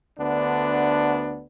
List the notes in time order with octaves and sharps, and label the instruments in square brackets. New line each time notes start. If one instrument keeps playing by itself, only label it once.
[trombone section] D2 D3 B3 D4